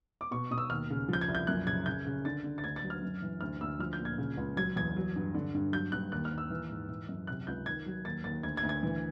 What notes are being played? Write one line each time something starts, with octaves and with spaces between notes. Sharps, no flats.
D6
B2 C#6
B2 D#6
E6
D#2 F6
C#3
F3 G6
G#6
C2
G6
F#2 F#6
C#3 G#6
C#3 G6
C#3
D3 A6
D3
A6
D2 G#6
A6
F#3
F6
F#2
E3
D2 F6
D2 E6
F3 F6
G6
A#2
G#6
C#3
C#2
F#3 G#6
E2 G#6
F#3
G2
D3
G2
F#3 G6
G2 F#6
D#2 F#6
F6
D#2
E6
E3
G#2
E3
F#2
C3 F#6
C#2 G6
D#3 G#6
F#3
D#2 A6
D#2 A6
D2 G#6
G#6
D2
G#6
E3